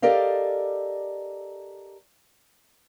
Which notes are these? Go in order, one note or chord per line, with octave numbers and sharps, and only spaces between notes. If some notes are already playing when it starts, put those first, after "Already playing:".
G4 A4 A#4 D5 D#5 F5